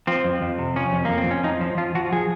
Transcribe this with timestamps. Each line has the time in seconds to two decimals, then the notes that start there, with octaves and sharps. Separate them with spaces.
0.07 F3 C4
0.24 F2
0.42 F2
0.59 C3
0.76 F3 C#4
0.93 F2
1.05 F2 A#3
1.18 C4
1.26 F2 C#4
1.43 F3 D#4
1.61 F3
1.77 F3 F4
1.95 F3 F#4
2.12 F3 G#4